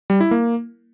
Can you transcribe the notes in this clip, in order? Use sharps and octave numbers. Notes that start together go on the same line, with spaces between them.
G3
E4
A#3